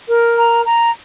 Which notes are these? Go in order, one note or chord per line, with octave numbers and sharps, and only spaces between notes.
A#4
A#5
A#5